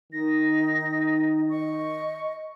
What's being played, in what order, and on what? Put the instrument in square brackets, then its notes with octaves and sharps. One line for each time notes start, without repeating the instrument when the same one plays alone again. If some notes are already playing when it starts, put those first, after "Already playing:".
[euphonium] D#3 [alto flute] D#4 [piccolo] A#6
[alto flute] D#5 [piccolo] C#6